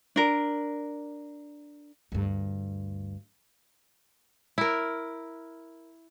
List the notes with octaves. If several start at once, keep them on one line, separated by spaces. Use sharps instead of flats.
D4 A#4
D2 G2
E4 A#4